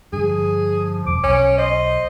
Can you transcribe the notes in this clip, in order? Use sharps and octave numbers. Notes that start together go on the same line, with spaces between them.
G2 D3 F3 G#4
E1 F2 D6
B1 C#4
C5 D#5